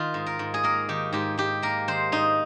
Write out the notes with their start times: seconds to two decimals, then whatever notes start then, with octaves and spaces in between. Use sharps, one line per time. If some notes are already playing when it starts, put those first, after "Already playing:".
Already playing: D#3 F4
0.14 G#2
0.26 A#4
0.39 G#2
0.54 G#4
0.63 A#3 A#4
0.89 D#3 G4
1.13 G#2 G4
1.38 G#2 G4
1.62 A#3 A#4
1.88 D#3 C5
2.12 G#2 D#4